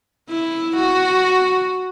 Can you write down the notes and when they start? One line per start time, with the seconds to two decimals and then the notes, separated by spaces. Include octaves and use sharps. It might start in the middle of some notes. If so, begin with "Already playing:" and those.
0.29 E4
0.76 F#4